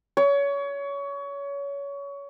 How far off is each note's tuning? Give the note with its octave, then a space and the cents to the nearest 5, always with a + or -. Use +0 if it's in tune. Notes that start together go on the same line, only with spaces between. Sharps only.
C#5 +25